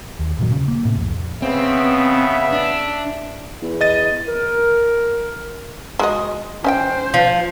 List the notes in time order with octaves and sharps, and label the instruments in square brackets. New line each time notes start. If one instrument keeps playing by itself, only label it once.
[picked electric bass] D#2
G2 A#2 D#3 F#3
C#3
A#3
A2 C3
C2 F2
[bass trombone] C#3 [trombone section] B3 [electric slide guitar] C4 [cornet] E5
[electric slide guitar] D4
[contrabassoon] E2
[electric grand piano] D#5 A6 D#7
[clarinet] A#4
[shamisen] G#3 F#4 D#5
[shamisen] C#4 E5 G5 [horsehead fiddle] C5
[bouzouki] F3